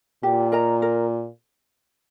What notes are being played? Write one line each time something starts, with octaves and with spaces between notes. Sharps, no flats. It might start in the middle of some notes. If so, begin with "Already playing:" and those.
A#2 G4
A#4 D#5 A#5
A#4